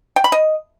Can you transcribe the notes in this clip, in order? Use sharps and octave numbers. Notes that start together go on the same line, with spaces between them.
G5
B5
D#5